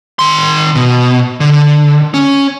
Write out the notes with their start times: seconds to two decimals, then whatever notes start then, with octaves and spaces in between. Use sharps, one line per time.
0.19 D#3 C6
0.75 B2
1.40 D3
2.14 C#4